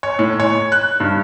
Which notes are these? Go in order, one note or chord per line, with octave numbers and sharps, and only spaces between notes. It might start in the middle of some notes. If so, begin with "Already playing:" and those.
C#5
A2
C#5
F#6
G2